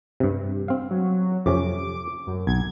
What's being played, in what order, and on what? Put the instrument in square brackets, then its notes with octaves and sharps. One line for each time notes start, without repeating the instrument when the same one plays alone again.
[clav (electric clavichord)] G2 C3
C4 F5
[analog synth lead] F#3
[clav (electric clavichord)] F2 C3 C#4 [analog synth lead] D6
[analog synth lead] F#2
[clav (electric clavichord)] B1 [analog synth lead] G#6